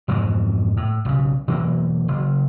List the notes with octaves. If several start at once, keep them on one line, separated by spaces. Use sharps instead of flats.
F2 G#2 B2 E3
A2
B1 C#3
B2 E3 F#3 A#3
F#1